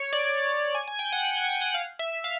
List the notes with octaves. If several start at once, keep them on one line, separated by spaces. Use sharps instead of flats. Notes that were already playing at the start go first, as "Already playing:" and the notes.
Already playing: C#5
D5
G#5
G#5
G5
F#5
G5
G#5
G5
F#5
F5
E5
F5